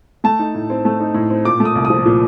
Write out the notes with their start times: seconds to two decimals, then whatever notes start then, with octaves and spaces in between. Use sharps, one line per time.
0.24 A3 A5
0.39 D#4
0.54 A2
0.70 C4
0.85 A3
1.00 D#4
1.14 A2
1.30 C4
1.45 A#2 D6
1.60 A3
1.65 D#6
1.75 C2
1.85 D#6
1.90 F3
2.06 A#2